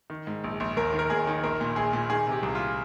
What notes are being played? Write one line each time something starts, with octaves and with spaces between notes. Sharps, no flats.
D#3
G#2
A#1
A#1
D#2 A#4
D#3
A#4
D#2 G#4
D#3
A#1 A#4
A#2
A#1 G#4
A#2
D#3 G#4
C3
G4
C2
F4